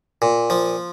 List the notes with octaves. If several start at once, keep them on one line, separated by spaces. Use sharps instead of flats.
A#2
F3